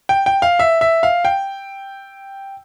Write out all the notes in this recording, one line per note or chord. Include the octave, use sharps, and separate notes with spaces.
G5
G5
F5
E5
E5
F5
G5